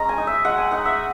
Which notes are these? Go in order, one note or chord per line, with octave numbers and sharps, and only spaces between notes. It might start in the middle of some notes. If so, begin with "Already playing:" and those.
Already playing: G#3 C#4 A#5
G#5
D#4
E5
G#3 F#5
G#5
D#4 F#5
E5